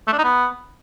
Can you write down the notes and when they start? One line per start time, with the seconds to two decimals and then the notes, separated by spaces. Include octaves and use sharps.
0.07 A3
0.13 D4
0.18 D#4
0.24 B3